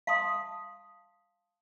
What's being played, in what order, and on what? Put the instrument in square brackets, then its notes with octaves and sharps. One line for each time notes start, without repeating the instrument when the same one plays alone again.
[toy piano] F5 A5 C6 D#6